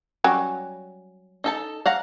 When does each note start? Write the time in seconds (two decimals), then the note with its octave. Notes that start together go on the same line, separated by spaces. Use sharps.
0.24 F#3 G3 C#4
1.44 D#4 A4 A5
1.86 F5 F#5 A#5